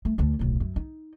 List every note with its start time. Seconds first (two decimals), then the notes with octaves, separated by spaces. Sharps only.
0.05 A3
0.18 D2 D3
0.39 D1 B1
0.60 F#2
0.76 D#4